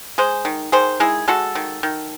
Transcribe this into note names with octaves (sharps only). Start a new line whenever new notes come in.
G#3 G#4 C5
D#3
D#3 G#4 C5
G#3 E4 G#4
G#3 F#4 A4
D#3
D#3